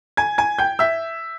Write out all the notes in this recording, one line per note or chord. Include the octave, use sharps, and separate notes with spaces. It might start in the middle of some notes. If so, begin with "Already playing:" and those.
G#5 G#6
G#5 G#6
G5 G6
E5 E6